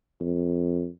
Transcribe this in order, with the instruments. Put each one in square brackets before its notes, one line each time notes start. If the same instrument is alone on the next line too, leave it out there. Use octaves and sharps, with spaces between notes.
[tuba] F2